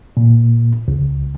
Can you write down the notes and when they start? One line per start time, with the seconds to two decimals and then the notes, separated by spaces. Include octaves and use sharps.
0.17 A#2
0.88 C#2